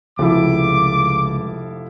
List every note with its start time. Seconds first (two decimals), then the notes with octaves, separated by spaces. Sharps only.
0.19 F1 C#2 F3 E4 D6